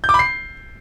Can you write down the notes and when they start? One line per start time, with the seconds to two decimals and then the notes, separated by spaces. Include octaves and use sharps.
0.04 G6
0.09 D6
0.14 B5
0.19 C7